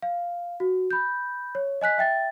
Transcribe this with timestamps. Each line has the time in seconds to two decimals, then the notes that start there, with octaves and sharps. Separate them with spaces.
0.02 F5
0.60 F#4
0.91 B5 G6
1.55 C#5
1.81 D#5 G#5 F#6 B6
1.98 E5 G5 A6